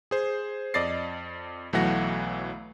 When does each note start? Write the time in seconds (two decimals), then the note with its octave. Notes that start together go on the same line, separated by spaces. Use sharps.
0.11 G#4 C5
0.74 F2 D5 D#5 A6 C7
1.73 B1 E3 F#3 A3 F#5 A#6